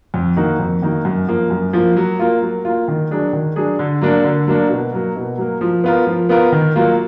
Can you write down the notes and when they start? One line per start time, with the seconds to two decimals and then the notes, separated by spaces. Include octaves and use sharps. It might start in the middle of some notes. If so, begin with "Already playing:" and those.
0.14 F2
0.36 D#3 A#3 D#4 F#4
0.59 F2
0.82 D#3 A#3 D#4 F#4
1.05 F#2
1.28 F3 A#3
1.50 F#2
1.73 F3 A#3
1.97 F#3
2.19 A#3 F4
2.42 F#3
2.65 A#3 F4
2.88 D#3
3.11 F#3 D4 G#4
3.33 D#3
3.56 F#3 D4 G#4
3.79 D3
4.01 F#3 A#3 D4
4.24 D3
4.47 F#3 A#3 D4
4.69 B2
4.93 F#3 A#3
5.16 B2
5.38 F#3 A#3
5.61 F3
5.84 B3 F4 A#4
6.07 F3
6.29 B3 F4 A#4
6.52 D#3
6.75 F#3 A#3 F4